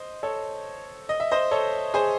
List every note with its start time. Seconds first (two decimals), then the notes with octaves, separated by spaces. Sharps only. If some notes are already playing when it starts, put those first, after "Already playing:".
Already playing: C5 D#5
0.23 A4 C#5
1.09 D#5
1.20 E5
1.31 C5 D#5
1.51 A4 C#5
1.94 G#4 C5